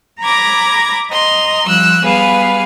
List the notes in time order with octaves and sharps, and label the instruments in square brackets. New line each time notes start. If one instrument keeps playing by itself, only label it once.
[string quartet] A#5 B5 D6 G#6 A#6
D#5 A#5 C6
F3 G3 E6 F#6
G3 B3 G#4 B4 F5